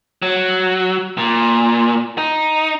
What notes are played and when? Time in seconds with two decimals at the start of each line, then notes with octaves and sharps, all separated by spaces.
0.22 F#3
1.18 A#2
2.18 D#4